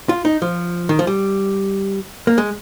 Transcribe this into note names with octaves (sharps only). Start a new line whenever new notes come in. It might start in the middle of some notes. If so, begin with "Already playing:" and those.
F4
D#4
F3
D#3
F3
G3
A#3
G#3